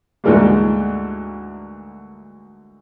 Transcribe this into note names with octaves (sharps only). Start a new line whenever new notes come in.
D2 G#2 E3 G3 G#3 A#3